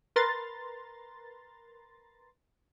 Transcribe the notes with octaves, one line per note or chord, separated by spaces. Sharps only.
A#4 B4 A#5 C6 A6